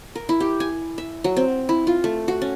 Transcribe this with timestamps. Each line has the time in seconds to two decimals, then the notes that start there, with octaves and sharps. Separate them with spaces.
0.15 A#4
0.29 E4
0.40 G4
0.60 G#5
0.98 E5
1.24 F#3
1.37 C4
1.69 E4
1.87 F4
2.04 A3
2.28 F#4
2.42 C#4